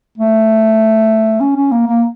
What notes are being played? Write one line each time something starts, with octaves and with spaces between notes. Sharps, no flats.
A3
C#4
C#4
A#3
A#3